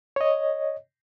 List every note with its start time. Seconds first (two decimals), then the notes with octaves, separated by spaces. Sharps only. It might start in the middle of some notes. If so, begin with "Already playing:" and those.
0.16 C#5 D#5